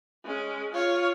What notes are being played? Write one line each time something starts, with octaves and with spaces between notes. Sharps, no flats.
G#3 C#4
F4 C#5